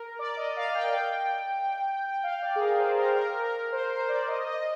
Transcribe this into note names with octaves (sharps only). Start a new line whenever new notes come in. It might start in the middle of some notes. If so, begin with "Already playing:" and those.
Already playing: A#4
D5
D#5
F5
G5
G5
F5
D5
G#4
A#4
C5
A#4
A#4
A#4
C5
C5
D5
D#5
D#5
D#5